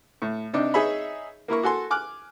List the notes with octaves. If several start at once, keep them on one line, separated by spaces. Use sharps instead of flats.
A2
C3 D4 D#4
D#4 G#4 C#5 E5 B5
A#3 E4 A#4 C#6
F#4 A4 G#5 C6
G#5 D6 F6 F#6